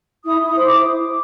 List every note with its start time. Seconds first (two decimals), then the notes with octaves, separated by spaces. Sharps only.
0.24 E4 D#6
0.40 E4
0.45 D#6
0.56 C5
0.66 E4 D6